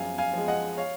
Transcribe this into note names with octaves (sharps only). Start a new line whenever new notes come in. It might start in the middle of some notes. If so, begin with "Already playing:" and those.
Already playing: F#2 F3 G#3 F5 G#5
F5 G#5
F3 G#3
D#5 F#5
C#5 F5